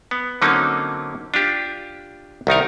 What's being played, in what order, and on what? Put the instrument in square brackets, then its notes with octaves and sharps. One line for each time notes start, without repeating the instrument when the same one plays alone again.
[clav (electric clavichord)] B3
D3 F#3 A#3 C4 C#4 D#4
D4 F4 G4
C2 D#3 D#4 A#4